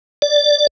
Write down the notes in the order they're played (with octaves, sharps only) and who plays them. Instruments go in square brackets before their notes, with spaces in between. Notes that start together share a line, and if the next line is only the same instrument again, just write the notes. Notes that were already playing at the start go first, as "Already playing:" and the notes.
[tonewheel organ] D5